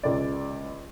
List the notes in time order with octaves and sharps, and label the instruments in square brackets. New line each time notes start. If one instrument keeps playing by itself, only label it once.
[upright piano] C#2 D5